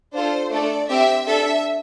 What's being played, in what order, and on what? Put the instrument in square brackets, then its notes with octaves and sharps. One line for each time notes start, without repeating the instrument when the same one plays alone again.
[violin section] D4 F4 A4 C5
A3 D4 A4 D5
C4 G4 E5
D4 A4 E5